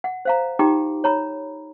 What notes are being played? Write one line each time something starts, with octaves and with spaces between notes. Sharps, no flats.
F#5
C5 F5 A#5
D#4 F4 G4 G5 A#5 D6
C#5 A#5 B5